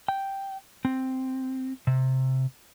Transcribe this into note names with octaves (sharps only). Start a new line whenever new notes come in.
G5
C4
C3